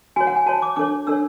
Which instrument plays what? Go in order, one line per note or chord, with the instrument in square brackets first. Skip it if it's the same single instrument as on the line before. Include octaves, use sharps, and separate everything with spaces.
[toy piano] F#4 C#5 G#5
F#5
G#5
F#4 C#5 A5
D6
D4 A4 C#5 D6
D4 A4 C#5 E6